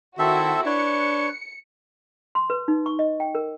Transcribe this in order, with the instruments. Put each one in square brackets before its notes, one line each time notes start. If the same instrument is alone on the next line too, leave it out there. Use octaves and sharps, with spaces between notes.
[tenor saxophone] D#3 [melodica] C4 A4 E5 [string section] E4 F#4
[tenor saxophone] D4 [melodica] B4 C#5 [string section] C#7
[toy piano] C6
B4
D#4
C#6
D#5
G5
A#4